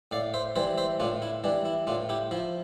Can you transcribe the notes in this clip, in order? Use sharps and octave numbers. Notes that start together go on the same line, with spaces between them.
A2 D5 F5
C5 E5
E3 G3 C5 E5
C5 E5
A2 D4 F4
E4
E3 G3 D4
E4
A2 D4 F4
E4 G4
F3 E4